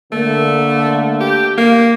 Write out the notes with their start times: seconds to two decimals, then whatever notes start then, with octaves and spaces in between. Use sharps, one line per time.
0.12 D3 A3 A#3
1.20 G4
1.58 A#3